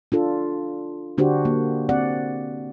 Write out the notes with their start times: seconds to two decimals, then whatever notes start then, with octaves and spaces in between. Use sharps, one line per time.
0.12 D4 F4 A4
1.18 D3 D4 F#4 G4 C5
1.45 A#3
1.89 C4 D5 F#5